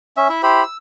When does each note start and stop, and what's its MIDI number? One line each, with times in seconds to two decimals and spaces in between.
0.17 0.28 61
0.17 0.28 76
0.29 0.42 64
0.29 0.42 76
0.43 0.63 64
0.43 0.63 67
0.43 0.63 72
0.43 0.63 83
0.63 0.77 88